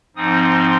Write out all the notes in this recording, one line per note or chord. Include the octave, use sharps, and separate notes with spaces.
G#2 F3 C4 D#4 D#6
C6